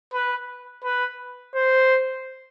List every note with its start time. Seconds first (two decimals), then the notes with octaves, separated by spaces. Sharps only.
0.13 B4
0.84 B4
1.55 C5